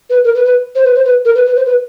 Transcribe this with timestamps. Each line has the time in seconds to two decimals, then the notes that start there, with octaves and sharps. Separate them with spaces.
0.09 B4
0.24 A#4
0.34 B4
0.45 B4
0.75 C5
0.84 B4
0.95 C5
1.05 B4
1.25 A#4
1.35 B4
1.45 B4
1.55 C5
1.65 B4